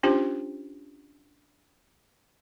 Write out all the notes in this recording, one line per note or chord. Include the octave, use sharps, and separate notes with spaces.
C#4 D4 F4 G4 C5